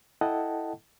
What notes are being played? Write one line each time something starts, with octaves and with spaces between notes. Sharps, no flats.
E4 A4 D#5 F#5 G5 A5